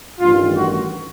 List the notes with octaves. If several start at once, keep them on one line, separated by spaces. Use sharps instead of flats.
A1 G2 D#3 F4
F#4